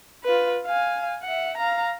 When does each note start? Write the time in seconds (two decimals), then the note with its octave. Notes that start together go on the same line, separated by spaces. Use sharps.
0.24 F4 B4
0.66 F5 G#5
1.24 E5 F#5
1.58 F5 A#5